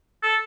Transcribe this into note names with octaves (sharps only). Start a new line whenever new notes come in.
A4